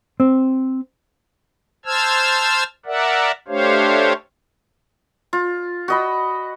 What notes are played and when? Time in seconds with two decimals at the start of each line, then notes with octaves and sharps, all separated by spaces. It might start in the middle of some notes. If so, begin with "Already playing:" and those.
0.20 C4
1.86 C5 A5 E6 F6 G#6
2.86 A#4 D5 E5 F#5
3.48 A3 D4 G4 C5 C#5 F5
5.33 F4
5.88 F#4 D#5 B5